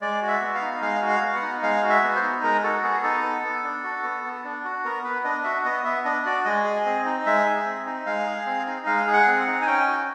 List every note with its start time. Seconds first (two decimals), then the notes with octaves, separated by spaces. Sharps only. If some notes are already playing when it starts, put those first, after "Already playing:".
0.01 G#3 D5
0.22 F#4
0.28 E5
0.41 B3
0.55 F5
0.61 D#4
0.81 G#3 F5
1.02 F#4
1.08 F5
1.22 B3
1.36 F#5
1.42 D#4
1.63 G#3 F5
1.83 F#4
1.89 E5
2.03 B3
2.16 C5
2.23 D#4
2.43 G#3 A#4
2.63 F#4 A4
2.83 B3 G#4
3.03 D#4 A4
3.23 B3
3.44 B3
3.63 D4
3.84 F#4
4.03 B3
4.24 B3
4.44 D4
4.65 F#4
4.85 B3 A#4
5.04 B3 B4
5.24 D4 D#5
5.44 F#4 E5
5.65 B3 D#5
5.85 B3 E5
6.05 D4 D#5
6.25 F#4 D5
6.45 G#3 D#5
6.65 G#4
6.86 C4
7.05 D#4
7.26 G#3 E5
7.46 G#4
7.66 C4
7.86 D#4
8.06 G#3 F5
8.27 G#4
8.46 C4
8.67 D#4
8.86 G#3 F5
9.07 G#4
9.13 F#5
9.27 C4
9.40 F#5
9.47 D#4
9.62 G#5
9.67 C#4 G5
9.87 F#4